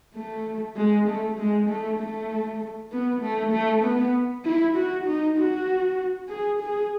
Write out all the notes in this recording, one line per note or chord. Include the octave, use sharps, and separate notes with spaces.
A3
G#3
A3
G#3
A3
A3
B3
A3
A3
B3
E4
F#4
D#4
F#4
G#4
G#4